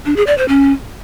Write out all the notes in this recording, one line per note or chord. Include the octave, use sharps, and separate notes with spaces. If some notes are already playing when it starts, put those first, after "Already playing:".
D4
G#4
D5
C5
C#4